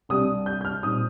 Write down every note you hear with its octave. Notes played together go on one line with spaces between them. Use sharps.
C2 C3 G3 D4 D#6
G6
G6
F6
A#2 G3 C4 D#4 D#6